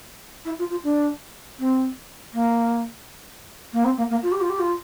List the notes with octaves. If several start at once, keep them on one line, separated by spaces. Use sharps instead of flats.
E4
F4
F4
D4
C4
A#3
A#3
C4
A#3
A#3
F4
G4
F4
G4
F4